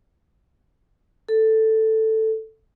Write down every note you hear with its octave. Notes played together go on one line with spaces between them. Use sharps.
A4